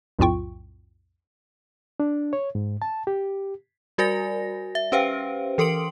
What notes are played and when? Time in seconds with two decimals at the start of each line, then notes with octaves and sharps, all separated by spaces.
0.19 B1 F2 A2 F4 G5 C#6
2.00 D4
2.33 C#5
2.55 G#2
2.82 A5
3.07 G4
3.98 G3 F#4 A#4 D5 G#5 A#6
4.75 E5
4.92 C#4 G4 B4 C5 F5 G5
5.58 E3 A4 A#4 C6 D7 F#7